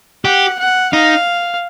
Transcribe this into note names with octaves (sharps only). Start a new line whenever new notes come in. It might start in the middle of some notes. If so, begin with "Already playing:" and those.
G4 F#5
F#5
D#4 F5